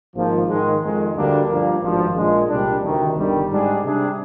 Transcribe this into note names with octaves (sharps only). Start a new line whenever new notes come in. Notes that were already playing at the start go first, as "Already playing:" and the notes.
G#1 G#2 F3 A#3
G#2 D#3 G#3
F2 D#3 G#3
D2 D3 G3 A#3 D4
G2 F3 A#3
G#1 G2 F3
A#1 A#2 G#3
C2 A#2 G3 D4
D2 C3 D#3
G1 G2 D#3 G3
G#2 G3 D4 G#4
C3 G3 D4 G#4